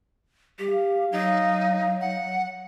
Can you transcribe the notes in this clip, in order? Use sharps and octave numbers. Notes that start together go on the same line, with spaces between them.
G3 G4
F5
F#3 D#4
F#5